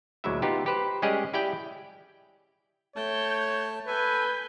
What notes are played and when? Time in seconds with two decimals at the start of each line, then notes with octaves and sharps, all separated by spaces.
0.24 D2 A#2 F#3 G#3 E4 E5
0.42 B3 D#4 F4 G4
0.66 G4 B4 C5
1.02 G3 G#3 C#4 G4 G#4 D#5
1.34 E4 G4 D5 G5 G#5
2.96 A3 C#5 G5 A5 G6
3.87 A4 B4 G#5 G6